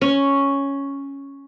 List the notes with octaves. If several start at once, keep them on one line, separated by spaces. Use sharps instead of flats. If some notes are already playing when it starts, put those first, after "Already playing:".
C#4